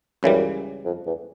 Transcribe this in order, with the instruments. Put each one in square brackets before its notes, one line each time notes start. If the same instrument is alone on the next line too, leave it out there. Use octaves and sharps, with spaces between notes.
[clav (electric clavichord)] C#2 C#3 E3 G3 [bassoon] F#2
[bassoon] F2
E2